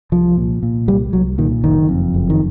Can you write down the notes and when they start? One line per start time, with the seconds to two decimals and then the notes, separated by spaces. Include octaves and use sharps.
0.12 C2 F3
0.37 A#2
0.63 A#2
0.88 C2 G3
1.13 C2 F#3
1.38 A#2 D#3
1.63 F#1 D#3
1.89 F2
2.14 F#1
2.30 D#3